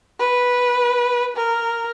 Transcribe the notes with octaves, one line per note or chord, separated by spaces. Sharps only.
B4
A#4